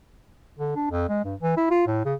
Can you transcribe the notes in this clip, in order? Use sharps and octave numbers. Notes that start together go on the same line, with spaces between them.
D3
D4
F2
G#3
G2
E3
E4
F4
A2
C#3